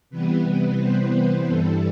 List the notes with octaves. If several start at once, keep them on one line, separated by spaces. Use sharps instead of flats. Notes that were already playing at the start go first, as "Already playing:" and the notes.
C3 E3 G3 B3 B4
B4
C5
B4
G2 E3 G3 A4